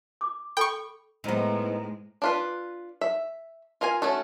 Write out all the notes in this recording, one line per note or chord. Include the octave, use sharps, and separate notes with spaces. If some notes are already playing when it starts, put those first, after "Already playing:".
D6
A4 G5 B5 C#6
A2 D#3 G#3 B3 E4 C5 A#5
D4 F4 B4
E5
F4 A#4 F5 G#5
A3 C#4 F#4 A4